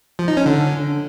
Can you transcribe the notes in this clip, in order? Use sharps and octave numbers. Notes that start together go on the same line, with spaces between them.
F3
D#4
C#4
D3